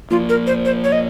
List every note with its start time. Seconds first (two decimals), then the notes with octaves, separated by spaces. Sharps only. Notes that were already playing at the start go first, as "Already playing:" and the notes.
0.11 A#1 A#2 F4
0.29 A#4
0.47 C5
0.65 C5
0.84 C#5
0.92 D#5